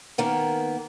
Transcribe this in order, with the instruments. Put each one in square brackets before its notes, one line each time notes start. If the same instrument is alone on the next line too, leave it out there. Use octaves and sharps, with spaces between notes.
[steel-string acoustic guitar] D#3 A#3 B3